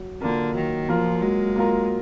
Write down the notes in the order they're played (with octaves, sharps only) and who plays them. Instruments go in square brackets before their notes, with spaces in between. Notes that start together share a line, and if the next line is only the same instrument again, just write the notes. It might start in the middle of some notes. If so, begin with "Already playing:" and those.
Already playing: [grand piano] F#3
[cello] D3 [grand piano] A#3 F4 A#4
[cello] D#3 [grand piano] F#3
[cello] F3 [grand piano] A#3 F4 A#4
[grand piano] F#3 [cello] G#3
[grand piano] A#3 F4 A#4